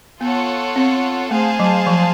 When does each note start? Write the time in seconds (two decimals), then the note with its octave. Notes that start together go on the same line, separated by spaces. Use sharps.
0.21 B3 F4 A4 C#5 F#5
0.76 C4
1.31 A3 G#4 C5 F5 A5
1.60 F#3
1.87 F3